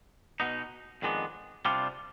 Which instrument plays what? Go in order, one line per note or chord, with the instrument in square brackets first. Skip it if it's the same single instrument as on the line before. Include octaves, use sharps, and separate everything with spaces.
[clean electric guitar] B2 B3 D#4
F2 D#3 G#3 B3 D4
C3 G3 D4 F4